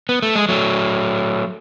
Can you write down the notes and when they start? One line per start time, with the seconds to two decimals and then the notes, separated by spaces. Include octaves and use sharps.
0.09 B3
0.23 A3
0.36 G#3
0.49 F#3 A3